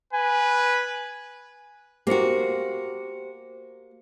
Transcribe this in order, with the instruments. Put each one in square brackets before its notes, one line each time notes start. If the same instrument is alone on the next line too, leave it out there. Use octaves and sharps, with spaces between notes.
[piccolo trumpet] B4 [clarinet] G#5
[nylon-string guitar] A#3 F#4 [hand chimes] G4 C5 C#7